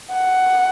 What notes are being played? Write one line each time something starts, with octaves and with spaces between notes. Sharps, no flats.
F#5